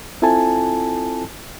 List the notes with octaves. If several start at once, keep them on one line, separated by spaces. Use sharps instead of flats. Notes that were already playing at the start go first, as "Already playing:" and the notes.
C4 E4 F4 A4 G#5 A5